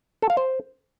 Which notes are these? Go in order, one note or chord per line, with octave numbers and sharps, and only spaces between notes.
A4
F5
C5